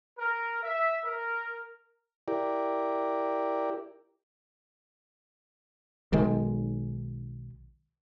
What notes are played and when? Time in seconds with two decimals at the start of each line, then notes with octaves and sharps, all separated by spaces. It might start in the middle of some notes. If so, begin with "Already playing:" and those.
0.18 A#4
0.63 E5
1.05 A#4
2.28 E4 G4 A#4 D5
6.13 B1 D#3 G#3